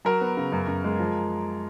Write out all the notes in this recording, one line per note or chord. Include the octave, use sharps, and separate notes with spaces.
F#3 A#4
B3
C#3
F#2
F#2
G#3
F3